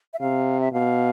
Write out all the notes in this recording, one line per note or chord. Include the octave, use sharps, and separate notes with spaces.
E5
C3 F5
E5
B2 F5